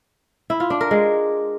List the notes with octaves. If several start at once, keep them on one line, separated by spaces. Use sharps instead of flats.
E4
F4
D4
A#4
G#3